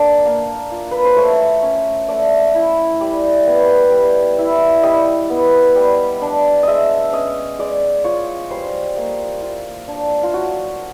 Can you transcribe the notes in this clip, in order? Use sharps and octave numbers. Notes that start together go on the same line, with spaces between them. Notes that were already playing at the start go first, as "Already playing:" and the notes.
Already playing: A#3 D4
A#3
F4
B4
C5
A3 C#5
C#4
A3 D5
E4
G3 D5
B3
G3
E4
G3 D#5
B3
G3
D4
G#3 D#5 E5
C#4 D#5
G#3 D5
F4 C#5
G3 C5
A#3
F4
D4
F4
F#3 F#4